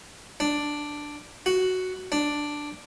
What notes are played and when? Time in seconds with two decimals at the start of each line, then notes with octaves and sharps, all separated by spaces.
0.40 D4
1.46 F#4
2.12 D4